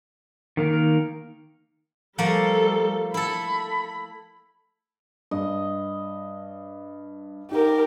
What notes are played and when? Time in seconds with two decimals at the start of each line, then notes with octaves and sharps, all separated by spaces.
0.57 D#3 A#3 A#4
2.18 F3 G3 A3 A#3 A4
3.14 E4 A4 B5
5.31 G2 D#5
7.51 D#4 G4 A#4